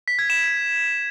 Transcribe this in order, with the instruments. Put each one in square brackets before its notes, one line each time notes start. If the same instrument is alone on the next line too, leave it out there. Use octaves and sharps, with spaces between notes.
[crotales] B6
G#6
E7